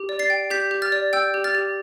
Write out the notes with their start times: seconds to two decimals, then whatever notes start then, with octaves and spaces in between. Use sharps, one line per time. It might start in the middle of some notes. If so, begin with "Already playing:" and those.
Already playing: G4
0.09 D5
0.19 A6 C7
0.30 G5
0.50 G4 G6 B6
0.71 G4
0.82 F6 A6
0.92 D5
1.13 G5 E6 G6
1.34 G4
1.44 F6 A6
1.55 G4